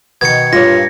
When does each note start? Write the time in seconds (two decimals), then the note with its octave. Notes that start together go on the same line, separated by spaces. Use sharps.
0.21 B2 D#3 G#6 C#7
0.53 G2 A#2 F4 C#5 A#6